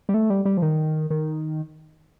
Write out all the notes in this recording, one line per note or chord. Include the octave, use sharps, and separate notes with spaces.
G3
A3
G3
G3
F3
D#3
D#3